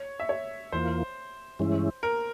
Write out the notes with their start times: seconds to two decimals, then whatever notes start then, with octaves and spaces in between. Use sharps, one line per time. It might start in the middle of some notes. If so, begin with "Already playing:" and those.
Already playing: C#5
0.20 E5
0.29 C#5
0.72 E2 E3 A#3 F4 C5
1.59 G2 E3 G#3 C#4 E4
2.03 A#4